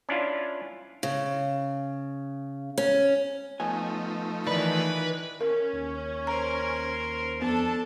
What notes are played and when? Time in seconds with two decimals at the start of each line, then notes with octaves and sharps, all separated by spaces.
0.09 C#4 D4 E4 F4
1.03 C#3
2.78 C#4
3.60 F3 A3 B3 D#4 G#5
4.47 D#3 E3 B4 D5 B5
5.41 C#4 A#4
5.73 D#2
6.27 A#4 C5 A#5
7.42 F2 B3 D4 A4 A5